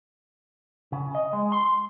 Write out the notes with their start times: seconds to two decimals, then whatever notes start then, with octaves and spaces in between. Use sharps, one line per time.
0.92 C#3
1.15 D#5
1.33 G#3
1.52 C6